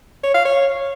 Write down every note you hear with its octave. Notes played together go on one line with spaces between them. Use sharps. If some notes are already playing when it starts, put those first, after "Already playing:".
C#5
F5
C#5